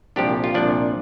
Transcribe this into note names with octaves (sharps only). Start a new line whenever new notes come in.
C2 A#2 F3 D4 G4
F4
C2 A#2 F3 D4